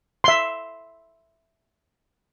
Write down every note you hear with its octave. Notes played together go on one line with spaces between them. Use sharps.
E5 C6